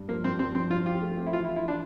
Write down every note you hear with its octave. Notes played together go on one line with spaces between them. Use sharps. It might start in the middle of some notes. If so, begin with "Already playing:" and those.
Already playing: G2
F3 A#3
G2 C4
F3 C4
F3 C4
F3 F4
F4 G4
A3
C4
E4
E3 F4
E4
F4
E4
E3 D4